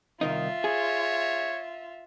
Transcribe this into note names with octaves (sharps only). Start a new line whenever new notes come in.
C2 D#3 D#4 F4 E5
G#4 C#5